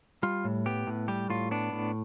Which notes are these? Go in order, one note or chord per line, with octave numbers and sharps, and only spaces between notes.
G3 F4
A2
B3 G4
A2
G3 G4
A2 F4
B3 D4
A2